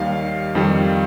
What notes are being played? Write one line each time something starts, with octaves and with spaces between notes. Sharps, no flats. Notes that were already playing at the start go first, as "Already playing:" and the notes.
Already playing: D#2 D#3 G3 F5
F2 D#3 G3